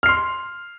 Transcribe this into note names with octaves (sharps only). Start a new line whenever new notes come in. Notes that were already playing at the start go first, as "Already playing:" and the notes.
C6 F6 C7